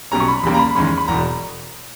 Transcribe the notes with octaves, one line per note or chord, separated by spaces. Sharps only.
B1 B2 G3 C#4 A#5
C#6
B5
E2 C#3 G3 A#3 B5
A#5
B5
E2 D#3 G#3 C#4 B5
B5
E1 E2 B2 A#5